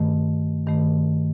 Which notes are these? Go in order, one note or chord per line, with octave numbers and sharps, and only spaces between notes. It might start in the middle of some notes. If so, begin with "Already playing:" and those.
Already playing: G2 D#3 A3
G2 D#3 A3